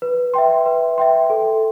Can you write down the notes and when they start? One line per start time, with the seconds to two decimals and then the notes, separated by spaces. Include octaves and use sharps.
0.02 B4
0.34 E5 G5 C6
0.66 B4
0.98 E5 G5 C6
1.30 A4